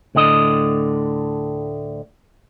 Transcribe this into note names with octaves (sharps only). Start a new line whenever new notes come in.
D2 A2 D3 D#5